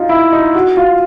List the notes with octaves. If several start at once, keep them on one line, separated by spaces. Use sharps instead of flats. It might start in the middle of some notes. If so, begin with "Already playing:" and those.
Already playing: D#4 F4
E4
D#4
F#4
F4